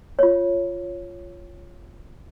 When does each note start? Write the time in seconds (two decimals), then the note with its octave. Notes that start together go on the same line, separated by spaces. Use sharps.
0.19 F4 C#5